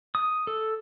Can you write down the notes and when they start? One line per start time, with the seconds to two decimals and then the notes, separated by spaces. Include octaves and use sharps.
0.15 D#6
0.47 A4